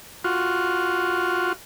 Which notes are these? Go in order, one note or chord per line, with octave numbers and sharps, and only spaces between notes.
F4 F#4